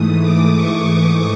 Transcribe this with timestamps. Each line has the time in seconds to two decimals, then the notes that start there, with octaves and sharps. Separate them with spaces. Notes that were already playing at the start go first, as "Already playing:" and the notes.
Already playing: G#2 E3 A3 D#6
0.22 D6
0.55 C#6
0.88 D6